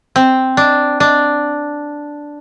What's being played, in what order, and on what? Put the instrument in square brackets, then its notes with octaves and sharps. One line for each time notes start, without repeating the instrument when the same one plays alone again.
[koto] C4
D4
D4